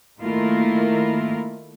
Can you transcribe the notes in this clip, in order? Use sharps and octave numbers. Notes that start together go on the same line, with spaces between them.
D#3 A3 A#3 E4 F4 A#4